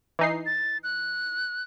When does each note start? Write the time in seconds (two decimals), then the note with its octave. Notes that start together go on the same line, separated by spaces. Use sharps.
0.19 E3 D#4 C7
0.46 A6
0.84 F#6